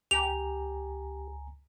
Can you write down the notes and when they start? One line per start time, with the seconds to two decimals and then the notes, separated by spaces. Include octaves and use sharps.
0.11 C#2 G4 G#5 A#5 F7